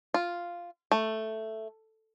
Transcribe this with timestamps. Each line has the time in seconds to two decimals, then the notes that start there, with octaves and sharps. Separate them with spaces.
0.14 F4
0.91 A3